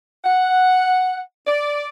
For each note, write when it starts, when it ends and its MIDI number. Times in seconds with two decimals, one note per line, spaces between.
0.25 1.19 78
1.47 1.87 74